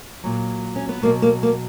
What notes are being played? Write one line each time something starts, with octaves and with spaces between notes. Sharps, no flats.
A#2 F#3
C#4
B3
B2 F#3 A#3
A#3
A#3